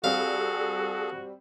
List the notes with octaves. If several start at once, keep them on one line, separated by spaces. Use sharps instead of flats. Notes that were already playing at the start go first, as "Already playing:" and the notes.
G3 C4 F#4 G#4 A4 F5